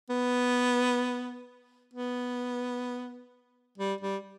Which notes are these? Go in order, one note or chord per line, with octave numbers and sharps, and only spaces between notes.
B3
B3
G3
G3